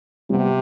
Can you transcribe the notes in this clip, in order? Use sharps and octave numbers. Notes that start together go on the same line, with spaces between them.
C3 G3 B3